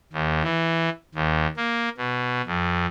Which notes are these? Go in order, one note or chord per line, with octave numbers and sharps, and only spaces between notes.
D#2
E3
D#2
A#3
B2
F2